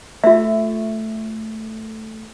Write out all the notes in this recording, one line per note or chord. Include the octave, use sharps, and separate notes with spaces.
A3 F4 E5